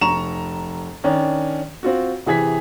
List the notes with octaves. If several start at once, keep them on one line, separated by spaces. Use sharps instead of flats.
F1 A#5 C#6 E7 F7
D#3 C#4 D4
C4 F4 F#4
C3 E3 G#4 G#6 B6